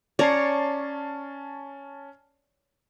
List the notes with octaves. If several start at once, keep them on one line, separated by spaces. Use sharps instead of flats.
C#4 C#5 D5 A5 A#5 C7